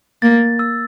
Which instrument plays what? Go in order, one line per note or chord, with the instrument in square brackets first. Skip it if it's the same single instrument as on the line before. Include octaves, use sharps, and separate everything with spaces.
[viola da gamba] A#3 [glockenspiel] A6
[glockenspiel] E6